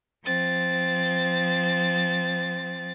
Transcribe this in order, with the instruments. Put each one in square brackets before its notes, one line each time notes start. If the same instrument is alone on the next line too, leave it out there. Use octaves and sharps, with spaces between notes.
[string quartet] F3 C4 A6